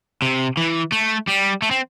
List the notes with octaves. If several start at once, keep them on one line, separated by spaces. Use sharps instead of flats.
C3
E3
A3
G3
A3
C4